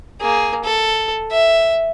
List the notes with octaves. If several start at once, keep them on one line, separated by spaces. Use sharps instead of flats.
A#3 G#4
A4
E5